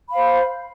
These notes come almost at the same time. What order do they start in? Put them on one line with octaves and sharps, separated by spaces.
B5 F5 C5